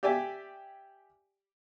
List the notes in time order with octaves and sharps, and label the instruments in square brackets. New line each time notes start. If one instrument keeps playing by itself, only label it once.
[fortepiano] G4 D5 E5 G5 G#5